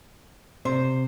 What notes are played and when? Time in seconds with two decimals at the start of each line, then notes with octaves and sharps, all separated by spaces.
0.65 C3 C5